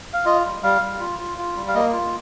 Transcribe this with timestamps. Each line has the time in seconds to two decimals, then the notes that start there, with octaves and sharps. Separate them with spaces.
0.14 F5
0.25 F4 D#5
0.45 G3
0.63 G3 F5
0.82 G3
1.00 F4
1.19 F4
1.38 F4
1.56 G3
1.68 F5
1.75 A#3 D#5
1.93 F4